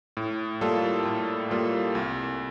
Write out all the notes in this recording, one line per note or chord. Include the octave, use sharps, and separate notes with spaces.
A2
G3 A#3 F4 A4
A2
G3 A#3 F4 A4
C2